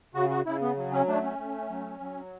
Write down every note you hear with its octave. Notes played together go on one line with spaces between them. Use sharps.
C#3 F#4
F#4
C#3 E4
B3
F#3
C#4
A3 D4
C#4
A3
F#3
F#3